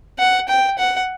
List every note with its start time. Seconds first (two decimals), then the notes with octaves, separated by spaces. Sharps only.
0.19 F#5
0.48 G5
0.78 F#5